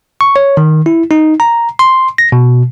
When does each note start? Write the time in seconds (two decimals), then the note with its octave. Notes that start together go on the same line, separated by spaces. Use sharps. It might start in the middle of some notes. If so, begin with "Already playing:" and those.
0.21 C#6
0.36 C#5
0.57 D#3
0.86 E4
1.11 D#4
1.40 A#5
1.79 C6
2.18 A#6
2.32 B2